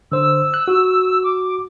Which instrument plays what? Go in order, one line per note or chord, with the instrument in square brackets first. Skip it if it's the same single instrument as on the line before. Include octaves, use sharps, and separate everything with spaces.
[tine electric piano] D3 C5 [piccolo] E6
[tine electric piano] F#6
F#4
[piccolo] D6